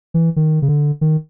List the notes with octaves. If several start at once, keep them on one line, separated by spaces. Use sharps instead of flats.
E3
D#3
C#3
D3
D#3